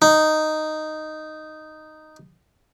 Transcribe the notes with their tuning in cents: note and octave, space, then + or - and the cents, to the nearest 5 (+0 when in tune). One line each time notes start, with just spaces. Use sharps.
D#4 -5